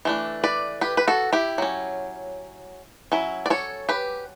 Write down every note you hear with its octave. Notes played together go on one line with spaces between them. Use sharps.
E3 A3 D4
B4 D5
G4 B4
B4
F#4 A4
E4 G4
F#3 C#4
F#3 C#4 E4
D5
A4 C#5
G4 B4